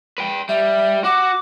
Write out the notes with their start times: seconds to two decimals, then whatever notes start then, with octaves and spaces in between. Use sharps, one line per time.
0.18 B4 G5
0.49 G3 E5
1.04 F#4 D6